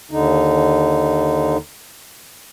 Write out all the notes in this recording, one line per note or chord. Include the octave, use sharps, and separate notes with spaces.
D#2 D3 D#4